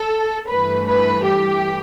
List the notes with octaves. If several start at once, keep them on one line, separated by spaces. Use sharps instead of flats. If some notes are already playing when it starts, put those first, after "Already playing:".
Already playing: A4
G2 E3 A3 B4
B4
G4